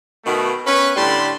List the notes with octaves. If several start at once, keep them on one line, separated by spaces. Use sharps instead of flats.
B2 D#3 A3
B3 C#4 B4
A2 D3 G3 A5 B5 C6